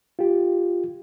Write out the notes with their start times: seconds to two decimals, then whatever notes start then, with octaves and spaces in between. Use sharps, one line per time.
0.19 F4 G4